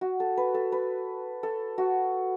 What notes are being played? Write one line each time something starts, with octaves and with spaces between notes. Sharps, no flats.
F#4
A4
B4
A4
B4
A4
F#4